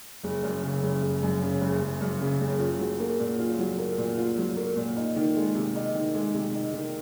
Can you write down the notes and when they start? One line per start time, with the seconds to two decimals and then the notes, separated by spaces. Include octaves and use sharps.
0.24 F#1
0.43 F#2
0.63 C#3
0.83 F#1
1.02 F#1
1.22 F#2
1.42 C#3
1.61 F#1
1.81 F#1
2.01 F#2
2.21 C#3
2.41 F#1
2.60 F4
2.80 F#3
3.00 A#3
3.20 A#2
3.39 F4
3.59 F#3
3.78 A#3
3.98 A#2
4.18 F4
4.38 F#3
4.56 A#3
4.76 A#2
4.96 D#4
5.16 D#3
5.36 G#3
5.55 C3
5.75 D#4
5.95 D#3
6.15 G#3
6.34 C3
6.54 D#4
6.73 D#3